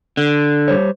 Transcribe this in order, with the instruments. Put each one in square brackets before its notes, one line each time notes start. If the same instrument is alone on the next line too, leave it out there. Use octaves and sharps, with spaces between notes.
[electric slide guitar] D3
[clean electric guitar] G3 C5 C#5